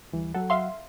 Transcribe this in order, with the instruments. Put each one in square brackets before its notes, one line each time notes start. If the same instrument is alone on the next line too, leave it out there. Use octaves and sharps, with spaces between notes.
[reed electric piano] D2 E3 G3
[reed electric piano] F#3 F#5 [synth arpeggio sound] A4
[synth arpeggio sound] E5 F5 C6